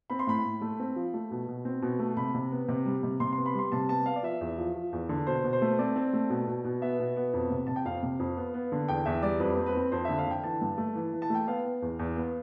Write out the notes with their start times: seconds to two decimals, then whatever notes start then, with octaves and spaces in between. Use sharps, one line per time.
0.10 C4 B5
0.19 C6
0.27 A2 B5
0.44 A2
0.62 A3
0.80 C4
0.96 F3
1.14 A3
1.31 B2
1.48 B2
1.65 C4
1.82 B2
1.99 A3
2.17 C3 B5
2.35 C3
2.51 B3
2.68 C3
2.86 G3
3.03 C3
3.20 C3 C6
3.33 B3 C6
3.46 B5
3.55 G3 C6
3.72 C3 A5
3.89 B3 A5
4.06 B3 F5
4.16 D5
4.23 F3 E5
4.41 E2
4.58 F3
4.75 F3
4.93 E2
5.09 D3
5.27 B2 C5
5.44 B2
5.53 C5
5.62 A3
5.79 C4 D5
5.96 C4
6.13 A3
6.30 B2
6.47 B2
6.64 B2
6.82 B3 E5
6.99 B2
7.16 B3
7.34 F2
7.50 C3
7.67 C3 A5
7.76 G5
7.85 F2 F5
8.03 C3
8.20 F2
8.37 B3
8.54 B3
8.72 D3
8.88 E2 G5
9.06 E2 E5
9.23 G3 D5
9.40 F2 B4
9.57 C4
9.66 B4
9.75 C4
9.92 F2 C5
10.05 D3 E5
10.18 F5
10.26 D3 G5
10.44 E3 A5
10.61 G2
10.78 A3
10.95 E3
11.13 E3
11.22 A5
11.30 A3 G5
11.47 B3 F5
11.65 B3
11.82 E2
11.99 E2
12.16 B3